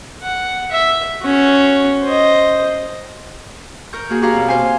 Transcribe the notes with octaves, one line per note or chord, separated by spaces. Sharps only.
F#5
E5
C#4 F#4
C5 D#5
A#4 C#6 G6
A#3 F#4 G#4
D4 F#4 G4 C#5 F5 A#5
B2 C4
C5 F5 G#5